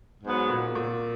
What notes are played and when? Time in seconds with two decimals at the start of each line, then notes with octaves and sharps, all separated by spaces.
0.23 G#2 F#3 B3
0.49 A#2
0.75 A#2